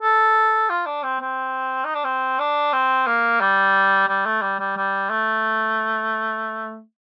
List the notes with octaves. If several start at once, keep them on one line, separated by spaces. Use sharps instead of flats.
A4
F4
D4
C4
C4
D#4
D4
C4
D4
C4
A#3
G3
G3
A3
G3
G3
G3
A3